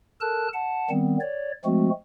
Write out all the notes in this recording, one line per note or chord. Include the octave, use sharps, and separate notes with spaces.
A4 A#4 A5 F#6
F#5 A5
D#3 G3 B3 C4
C#5 D5
F3 G#3 A3 C4 F#4